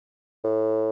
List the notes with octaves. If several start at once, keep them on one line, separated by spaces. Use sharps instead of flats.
A2